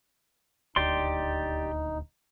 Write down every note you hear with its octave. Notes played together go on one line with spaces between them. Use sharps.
D#1 D2 D#4 G4 D5 C6